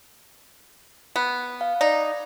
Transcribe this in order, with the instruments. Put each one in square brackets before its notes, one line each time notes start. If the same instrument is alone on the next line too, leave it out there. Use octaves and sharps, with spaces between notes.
[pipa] B3
[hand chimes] F5
[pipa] D#4 [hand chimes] D5